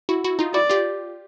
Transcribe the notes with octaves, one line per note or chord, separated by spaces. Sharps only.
E4 F#4
E4 F#4
D#4 F4
E4 F#4 D5
F4 G4